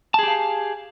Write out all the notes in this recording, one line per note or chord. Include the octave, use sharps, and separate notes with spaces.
G4 G#4 F5 A5